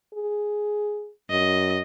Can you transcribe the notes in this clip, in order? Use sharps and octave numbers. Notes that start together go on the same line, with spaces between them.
G#4
F#2 D#5